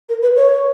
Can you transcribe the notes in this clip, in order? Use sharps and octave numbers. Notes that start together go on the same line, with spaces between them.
A#4
B4
C#5